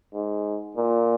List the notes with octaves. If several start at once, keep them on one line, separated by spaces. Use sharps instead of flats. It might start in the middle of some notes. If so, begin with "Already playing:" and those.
G#2
A#2